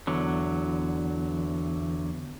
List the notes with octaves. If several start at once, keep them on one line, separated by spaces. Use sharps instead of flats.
E2 D3 F#3